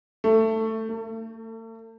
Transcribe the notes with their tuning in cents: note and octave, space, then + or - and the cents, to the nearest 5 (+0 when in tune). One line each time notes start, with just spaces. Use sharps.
A3 +15
A3 +40